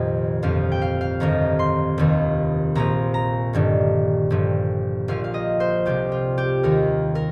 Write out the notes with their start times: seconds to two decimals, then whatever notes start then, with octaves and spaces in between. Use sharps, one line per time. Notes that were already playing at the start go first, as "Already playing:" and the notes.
Already playing: F1 A#1 F2 A#2 D#3
0.43 G1 F2 F3 F5
0.72 G5
0.82 F5
1.01 F5
1.20 G1 F2 D#3 A#5
1.59 C6
1.98 F1 D#2 D#3
2.75 A#1 A#2 F3 A#5
3.14 A#5
3.53 G1 G2 D#3
4.30 G1 G2 F3
5.08 A#1 A#2 F3 F5
5.24 F5
5.34 D#5
5.60 C5
5.86 C2 C3 F3 G4
6.12 F4
6.38 G4
6.63 D#2 D#3 A#4
7.15 A#4